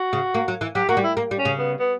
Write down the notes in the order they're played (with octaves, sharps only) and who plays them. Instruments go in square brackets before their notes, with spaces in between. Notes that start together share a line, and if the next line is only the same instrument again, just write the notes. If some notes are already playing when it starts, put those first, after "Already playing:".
Already playing: [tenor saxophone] F#4
[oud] C#3
A#3
F#3
E3
[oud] F#3 [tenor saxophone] G4
[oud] A#3 [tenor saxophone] F#4
[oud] G3
[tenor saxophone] E4
[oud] A#3
G3
[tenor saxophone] C#4
[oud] C#3
[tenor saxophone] B3
B3